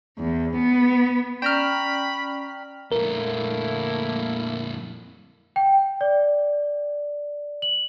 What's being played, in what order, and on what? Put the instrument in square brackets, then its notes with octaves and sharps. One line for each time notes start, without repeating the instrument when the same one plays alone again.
[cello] E2
B3
[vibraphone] C#4 D5 [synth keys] G5 A#5 F6 [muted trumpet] B5
[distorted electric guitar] F2 A#2 [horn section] A3 A#3 E4 [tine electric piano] A#4
[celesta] G5
D5
F#7